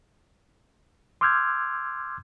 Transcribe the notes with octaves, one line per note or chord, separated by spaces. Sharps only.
C6 D6 E6 F6 G6 G#6